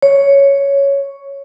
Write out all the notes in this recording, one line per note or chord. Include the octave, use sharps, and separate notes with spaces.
C#5